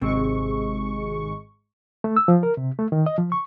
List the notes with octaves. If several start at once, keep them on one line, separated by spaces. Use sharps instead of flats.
G#1 C3 G#3 C4 C#6
A3
E6
F3
A#4
C3
A3
D#3
D#5
F3
C#6